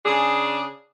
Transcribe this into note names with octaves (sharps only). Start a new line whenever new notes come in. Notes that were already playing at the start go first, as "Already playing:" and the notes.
C#3 D4 G#4